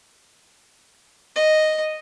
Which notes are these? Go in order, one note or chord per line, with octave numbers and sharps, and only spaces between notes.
D#5